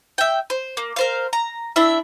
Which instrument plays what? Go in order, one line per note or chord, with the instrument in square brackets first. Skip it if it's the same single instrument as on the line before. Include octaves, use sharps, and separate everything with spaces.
[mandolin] E5 G5
C5
A#3
A#4 C5 F5
A#5
D4 E4 E5